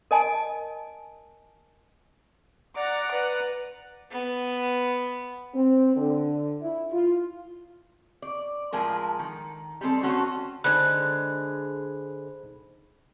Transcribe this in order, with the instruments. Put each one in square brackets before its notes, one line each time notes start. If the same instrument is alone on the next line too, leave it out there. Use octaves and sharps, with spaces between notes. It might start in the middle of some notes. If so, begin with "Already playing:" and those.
[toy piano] A#4 D#5 G#5 A5
[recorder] D5 [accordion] F#5 A#5 [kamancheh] D6
[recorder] B4 [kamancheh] D5
[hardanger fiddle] B3
[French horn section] C4
D3
E4
F4
[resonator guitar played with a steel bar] D5
A2 F3 G#3 A#4
D#3
G3 G#3 C4 A4
A3 C4 C#4 F#4
[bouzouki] D3 G#3 [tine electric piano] D#4 C5 B5 [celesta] F#6